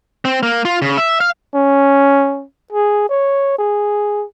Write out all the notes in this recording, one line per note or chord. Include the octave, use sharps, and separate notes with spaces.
C4
A#3
F4
C#3
E5
F5
C#4
G#4
C#5
G#4